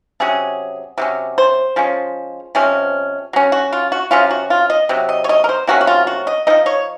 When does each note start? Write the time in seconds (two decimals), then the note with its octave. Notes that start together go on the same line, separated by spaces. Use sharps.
0.20 C3 F#3 C#4 G#4
0.98 C3 F#3 C#4
1.38 C5
1.76 F3 G#3 C#4
2.55 C3 F3 G#3 C#4
3.33 F#3 C#4
3.52 F#4
3.73 F4
3.92 F#4
4.11 C3 D#3 F#3 C#4 F4
4.31 F#4
4.50 F4
4.70 D#5
4.89 C3 F#3
5.09 D#5
5.24 C#5
5.29 D#5
5.44 A#4
5.49 C5
5.67 C3 F#3 A#3 C#4 F#4
5.81 F#4
5.87 F4
6.07 F#4
6.27 D#5
6.47 C4 D#4 D#5
6.50 F3
6.66 C#5